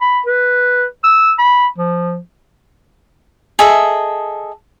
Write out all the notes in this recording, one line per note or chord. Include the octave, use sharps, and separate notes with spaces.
B5
B4
E6
B5
F3
G#4 A4 D#5 E5